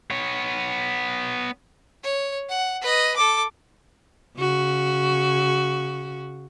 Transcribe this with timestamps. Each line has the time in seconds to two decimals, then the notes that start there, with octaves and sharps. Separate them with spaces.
0.11 B3 C#5
2.03 C#5
2.49 F#5
2.82 B4 D#5
3.16 A4 D6
4.38 C#3 F#4